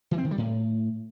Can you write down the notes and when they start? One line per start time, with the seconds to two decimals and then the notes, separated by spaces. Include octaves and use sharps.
0.11 E3
0.18 C4
0.24 D#3
0.31 G3
0.38 A2